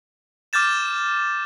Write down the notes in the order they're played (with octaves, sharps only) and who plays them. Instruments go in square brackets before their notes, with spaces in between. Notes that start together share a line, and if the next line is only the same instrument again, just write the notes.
[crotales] D6 F6 G6 A6 E7